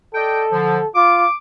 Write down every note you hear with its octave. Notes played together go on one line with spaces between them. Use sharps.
A4 D5 D#5 G5
D3 F3
F4 D6